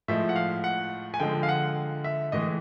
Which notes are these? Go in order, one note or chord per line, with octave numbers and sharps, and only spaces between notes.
A2 F3 G#3 E5
F#5
F5
F#5
G#5
D3 F3 G#3 G5
F5
F#5
E5
A2 E3 G#3 D#5